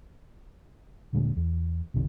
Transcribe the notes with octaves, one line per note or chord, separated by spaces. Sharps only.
D#1 A#2 D3 G#3
E2
F#1 B1 C3 D#3